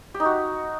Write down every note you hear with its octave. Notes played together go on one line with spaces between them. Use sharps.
G4
D#4
F#4